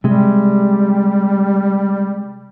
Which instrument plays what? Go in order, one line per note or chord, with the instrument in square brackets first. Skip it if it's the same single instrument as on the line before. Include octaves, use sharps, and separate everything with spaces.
[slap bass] C3 G#3 [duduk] G3